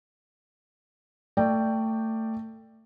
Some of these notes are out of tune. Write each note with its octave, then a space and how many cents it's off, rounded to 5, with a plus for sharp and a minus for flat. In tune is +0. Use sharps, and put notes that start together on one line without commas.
A3 +25 D5 +10 G5 +0